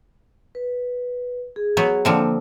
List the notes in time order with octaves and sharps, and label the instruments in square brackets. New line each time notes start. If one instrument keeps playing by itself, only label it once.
[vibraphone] B4
G#4
[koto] F#3 B3
[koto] D3 F3 C4 [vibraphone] A#3